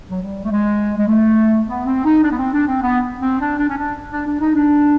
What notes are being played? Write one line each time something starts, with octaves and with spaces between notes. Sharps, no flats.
F#3
G3
A3
G#3
G#3
A3
B3
C4
D#4
D4
B3
C4
D4
C4
B3
C4
D4
D4
C#4
D4
D4
D4
D#4
D4